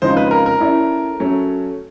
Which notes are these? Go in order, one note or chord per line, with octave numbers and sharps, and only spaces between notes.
C#3 F3 G#3 C4 D#4 C5
B4
A#4
A#4
A3 C#4 E4 A4 D5
F#3 A3 C#4